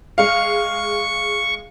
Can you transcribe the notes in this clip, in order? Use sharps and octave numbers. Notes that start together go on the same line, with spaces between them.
G#3 F5 C#6